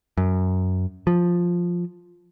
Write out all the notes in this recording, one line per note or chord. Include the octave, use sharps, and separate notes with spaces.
F#2
F3